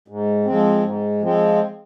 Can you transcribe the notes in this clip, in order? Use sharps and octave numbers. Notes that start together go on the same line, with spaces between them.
G#2
F3 G#3 C4
G#2
F3 G#3 C4